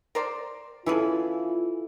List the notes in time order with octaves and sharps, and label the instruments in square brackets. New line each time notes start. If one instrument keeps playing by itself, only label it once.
[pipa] A#4 C5 D5
[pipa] E3 C#4 G#4 [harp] E4 A4 [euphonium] F4